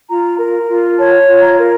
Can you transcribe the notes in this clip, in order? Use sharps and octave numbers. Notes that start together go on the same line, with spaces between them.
F4 A#5
A#4
F4
C#5 A5
F4
A#5
A#4